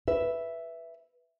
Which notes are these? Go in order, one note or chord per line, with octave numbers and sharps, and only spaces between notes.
B4 E5